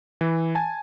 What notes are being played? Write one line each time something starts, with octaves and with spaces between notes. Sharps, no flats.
E3
G#5 A5